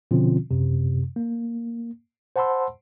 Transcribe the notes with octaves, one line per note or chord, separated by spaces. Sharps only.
B2 D3 F3 C4 C#4 F4
F#2 C3
A#3
C5 F#5 A5 B5 C6 E6